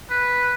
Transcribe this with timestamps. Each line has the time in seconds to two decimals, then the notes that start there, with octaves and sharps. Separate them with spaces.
0.10 B4